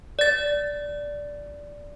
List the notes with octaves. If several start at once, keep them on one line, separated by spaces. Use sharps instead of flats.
D5 A6